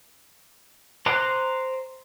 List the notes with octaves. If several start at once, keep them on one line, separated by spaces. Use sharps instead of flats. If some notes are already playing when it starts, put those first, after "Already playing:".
C5 A#5 C6 D6 F#6